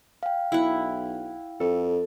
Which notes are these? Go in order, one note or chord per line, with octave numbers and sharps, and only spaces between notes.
F5 G5
B1 E4 F#5
F2 A4